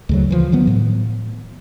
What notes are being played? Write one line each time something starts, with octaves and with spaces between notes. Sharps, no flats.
D2 C#3 F#3
E3 F3
D#3 F#3 B3
A2